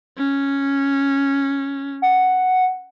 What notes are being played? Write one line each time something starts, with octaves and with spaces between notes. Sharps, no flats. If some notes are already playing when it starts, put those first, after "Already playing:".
C#4
F#5